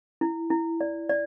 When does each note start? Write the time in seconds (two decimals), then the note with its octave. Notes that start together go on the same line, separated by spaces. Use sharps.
0.21 E4
0.50 E4
0.81 D5
1.09 D5